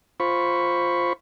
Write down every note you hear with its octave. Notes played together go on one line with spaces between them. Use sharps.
F4 C5 B5 C#6